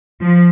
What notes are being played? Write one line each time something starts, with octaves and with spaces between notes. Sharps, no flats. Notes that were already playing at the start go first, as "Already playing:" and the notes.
F3